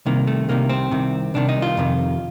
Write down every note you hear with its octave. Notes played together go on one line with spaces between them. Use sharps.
C2 C3 D#3 A#3
A3
C2 C3 D#3 A#3
C4
C2 C3 D#3
C2 C3 D#3 D4
D#4
F4
F2 C3 D#3